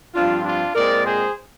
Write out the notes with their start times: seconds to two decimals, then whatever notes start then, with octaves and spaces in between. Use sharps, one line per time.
0.14 G2 F3 C4 D4 F4
0.45 D4 F4
0.75 A#2 G#3 C4 A#4 D5
1.06 G#4 C5